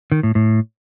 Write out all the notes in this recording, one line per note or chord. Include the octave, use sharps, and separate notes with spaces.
D#3
A2
A2